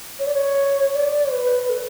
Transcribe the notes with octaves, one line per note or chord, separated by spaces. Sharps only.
C#5
D5
C#5
D5
B4
A4